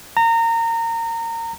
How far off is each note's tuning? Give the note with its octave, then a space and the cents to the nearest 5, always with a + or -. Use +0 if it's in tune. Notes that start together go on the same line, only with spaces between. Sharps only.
A#5 -25